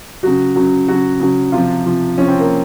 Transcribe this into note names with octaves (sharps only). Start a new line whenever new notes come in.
C#3 F#3 F#4
C#3 F#3
C#3 F#3 F#4
C#3 F#3
C3 F3 F4
C3 F3
C3 F3 C#4
C4
A#3